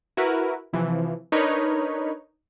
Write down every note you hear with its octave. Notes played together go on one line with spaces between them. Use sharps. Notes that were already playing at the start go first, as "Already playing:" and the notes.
E4 F#4 A#4 B4
C3 E3 F3
D4 D#4 A#4 B4 C#5 B5